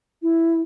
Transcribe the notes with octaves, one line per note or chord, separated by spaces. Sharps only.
E4